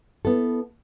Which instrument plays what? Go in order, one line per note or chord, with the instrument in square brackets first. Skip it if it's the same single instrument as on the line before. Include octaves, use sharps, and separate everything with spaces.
[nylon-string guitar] B3 E4 A4